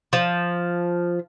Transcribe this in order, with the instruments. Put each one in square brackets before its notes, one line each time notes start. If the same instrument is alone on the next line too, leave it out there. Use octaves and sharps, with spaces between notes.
[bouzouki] F3